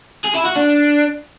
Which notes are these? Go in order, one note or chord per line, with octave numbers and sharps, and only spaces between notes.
G#4
E4
F#4
D4